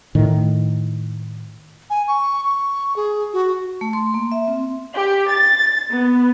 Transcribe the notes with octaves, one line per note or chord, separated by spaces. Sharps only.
A2 D#3
G#5
C#6
C#6
G#4
F#4
A3
C6
A#3
E5
C4
G4
A6
B3